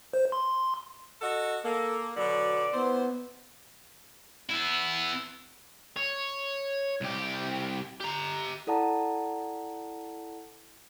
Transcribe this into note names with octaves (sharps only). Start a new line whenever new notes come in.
C5
C6
F#4 A4 D#5
A#3 A4
B2 D3 F#3 D5
B3 E4 C5
B3 E4
C#5
C2 G4
G4 A#5
E4 A4 D5 F#5 A5 A#5